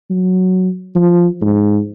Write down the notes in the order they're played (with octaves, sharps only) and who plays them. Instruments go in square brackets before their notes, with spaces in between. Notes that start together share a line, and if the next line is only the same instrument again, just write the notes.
[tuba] F#3
F3
G#2